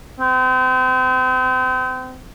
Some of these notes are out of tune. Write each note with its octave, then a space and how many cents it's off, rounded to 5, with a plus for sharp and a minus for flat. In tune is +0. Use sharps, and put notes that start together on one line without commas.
C4 -35